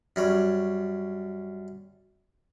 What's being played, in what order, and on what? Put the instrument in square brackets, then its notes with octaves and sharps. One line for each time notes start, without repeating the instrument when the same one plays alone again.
[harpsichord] F#2 G3 C#5